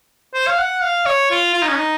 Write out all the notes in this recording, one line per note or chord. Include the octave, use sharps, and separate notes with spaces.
C5
F5
F#5
F5
C#5
F4
F4
D#4
C#4
D#4